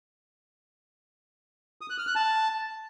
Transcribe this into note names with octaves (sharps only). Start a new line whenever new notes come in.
D#6
F#6
F6
F#6
A5